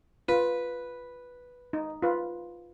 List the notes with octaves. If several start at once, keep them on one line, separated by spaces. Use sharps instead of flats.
F4 B4
D#4
F4 B4